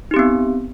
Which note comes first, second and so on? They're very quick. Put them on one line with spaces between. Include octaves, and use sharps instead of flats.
D#4 G4 C4 B3